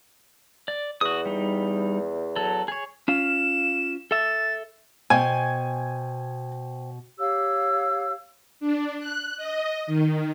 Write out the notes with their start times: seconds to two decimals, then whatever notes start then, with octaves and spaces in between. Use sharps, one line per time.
0.68 D5
1.01 E2 F#4 D#6
1.25 G3 D#4
2.36 F#3 A4
2.68 G#4 C#5
3.08 C#4 F4 F5 E7
4.11 A4 E5 A6
5.10 B2 C5 G5 G#5
7.18 G4 C#5 F5 E6
8.60 D4
8.99 F#6
9.37 D#5
9.87 D#3